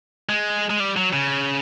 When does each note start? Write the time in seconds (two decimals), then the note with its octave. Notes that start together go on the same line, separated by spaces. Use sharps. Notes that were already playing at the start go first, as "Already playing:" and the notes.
0.29 G#3
0.70 G#3
0.80 G3
0.97 F#3
1.13 C#3